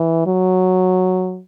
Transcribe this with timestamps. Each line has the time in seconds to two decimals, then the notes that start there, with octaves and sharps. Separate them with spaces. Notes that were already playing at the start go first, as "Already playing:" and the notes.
Already playing: E3
0.26 F#3